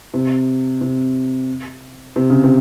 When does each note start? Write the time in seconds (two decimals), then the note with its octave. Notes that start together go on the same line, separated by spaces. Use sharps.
0.14 C3
0.81 C3
2.16 C3
2.30 C#3
2.44 C3